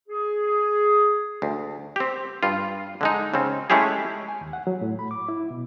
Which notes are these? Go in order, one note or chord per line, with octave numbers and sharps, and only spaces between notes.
G#4
D2
C4 G4
G2 F4
D3 G#3 D#4
C#3 C4
G#3 A3 C#4 E4 G4 G#4
G#5
D#2
F#5
F#3
A2
B5
D6
E4
B2